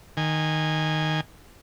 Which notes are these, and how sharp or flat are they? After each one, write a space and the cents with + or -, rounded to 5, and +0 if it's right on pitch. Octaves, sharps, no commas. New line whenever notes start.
D#3 +0 G#5 -20